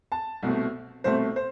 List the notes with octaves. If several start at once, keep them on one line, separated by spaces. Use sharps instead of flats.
A5
C2 B2 A3 C4
C2 B2 A3 C4 C5
C5